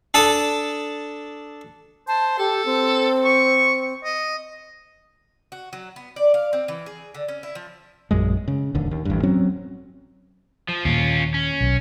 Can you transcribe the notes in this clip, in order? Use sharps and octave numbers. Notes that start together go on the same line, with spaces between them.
D4 A4 A5 D#6
C5 A5
G4 A4
C4
C#6
D#5
F#4
F#3
B3
D5
F5
C4
E3
G#4
D3
C#4
E4
F3
A#1 F#2 G#3
C#3
D1 D#2 D3
D#2
A1 G2
F#3 C4 C#4
F3
D#2 A#2 C#4 F4
C#4
B1